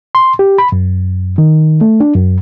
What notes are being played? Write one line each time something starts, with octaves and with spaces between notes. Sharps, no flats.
C6
G4
B5
F#2
D#3
A3
D4
F#2